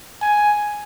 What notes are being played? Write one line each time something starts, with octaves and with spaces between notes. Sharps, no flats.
G#5